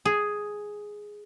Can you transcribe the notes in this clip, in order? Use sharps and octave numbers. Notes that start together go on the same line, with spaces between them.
G#4